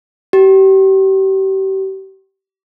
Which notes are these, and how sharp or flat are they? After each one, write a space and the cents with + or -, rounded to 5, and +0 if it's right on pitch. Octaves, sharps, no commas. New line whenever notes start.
G4 -35